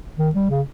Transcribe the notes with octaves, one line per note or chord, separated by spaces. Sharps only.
D#3
G3
C#3